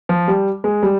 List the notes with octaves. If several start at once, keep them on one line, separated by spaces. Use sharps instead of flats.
F3
G3
G#3
G3